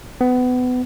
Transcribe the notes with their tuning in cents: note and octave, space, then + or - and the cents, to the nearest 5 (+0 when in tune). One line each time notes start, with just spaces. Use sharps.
B3 +25